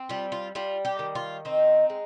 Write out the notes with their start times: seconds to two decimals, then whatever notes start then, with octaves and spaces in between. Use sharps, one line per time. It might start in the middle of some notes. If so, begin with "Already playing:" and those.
Already playing: C4
0.09 G3 F4
0.32 F4
0.55 G3 F4
0.85 G4
0.99 D#3
1.15 F4
1.45 C4 D#4
1.90 G#3